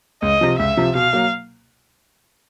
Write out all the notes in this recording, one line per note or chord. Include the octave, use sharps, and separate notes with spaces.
C#2 D#5
C3 F3
C#2 E5
C3 F3
B2 F5
F#3 A#3